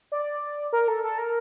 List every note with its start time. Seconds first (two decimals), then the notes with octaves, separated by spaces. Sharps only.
0.12 D5
0.73 A#4
0.88 A4
1.04 A4
1.18 A#4